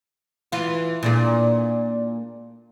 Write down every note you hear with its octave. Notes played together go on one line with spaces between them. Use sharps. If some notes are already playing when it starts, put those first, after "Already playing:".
E3 F4
A#2 D4 G#4